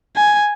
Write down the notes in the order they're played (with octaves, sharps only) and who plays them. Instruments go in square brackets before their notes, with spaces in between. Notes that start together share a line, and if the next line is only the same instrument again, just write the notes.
[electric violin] G#5